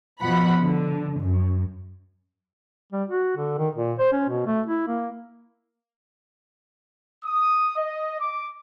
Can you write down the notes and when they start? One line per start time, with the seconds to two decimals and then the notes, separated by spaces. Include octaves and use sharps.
0.21 B2 F3 F#5 B5
0.63 D3
1.20 F#2
2.92 G3
3.09 F#4
3.37 D3
3.58 D#3
3.75 A#2
3.99 C5
4.12 C#4
4.29 B2
4.46 A3
4.66 E4
4.87 A#3
7.25 D#6
7.77 D#5
8.20 D6